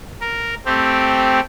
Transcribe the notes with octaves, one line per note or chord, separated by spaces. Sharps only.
A#4
A3 C4 G4